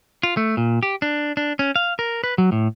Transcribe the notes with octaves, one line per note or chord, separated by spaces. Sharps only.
F4
A3
A#2
G4
D4
D4
C#4
F5
A#4
B4
F#3
A2